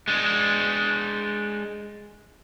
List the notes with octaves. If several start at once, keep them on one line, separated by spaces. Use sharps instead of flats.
G#3 D4